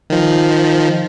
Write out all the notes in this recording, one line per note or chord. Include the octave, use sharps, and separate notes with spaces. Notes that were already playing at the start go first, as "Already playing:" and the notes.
D#3 F3